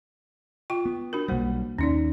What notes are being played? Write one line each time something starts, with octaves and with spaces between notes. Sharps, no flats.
F4 G5 C#6
B3
D4 F#4 A#4
B1 G3 A#3 C5
D#2 C#4 D#4 D5